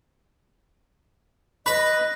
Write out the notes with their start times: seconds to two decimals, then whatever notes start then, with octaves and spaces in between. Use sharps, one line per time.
1.66 B4 D#5 B5